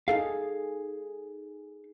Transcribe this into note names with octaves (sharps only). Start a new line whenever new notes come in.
D#4 G#4 A4 F5